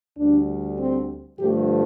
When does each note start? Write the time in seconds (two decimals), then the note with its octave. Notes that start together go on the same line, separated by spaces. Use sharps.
0.17 D2 D3 G3 D4
0.78 C4
1.39 G2 D3 F3 A3 G4